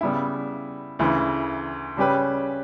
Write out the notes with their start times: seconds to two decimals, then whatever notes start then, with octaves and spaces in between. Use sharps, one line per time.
0.01 C#3 G3 B3 E4
0.99 D2 C#3 E3
1.97 C#3 G3 C#4 G4 B4